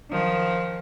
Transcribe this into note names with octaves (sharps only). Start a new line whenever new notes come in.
D#3 F3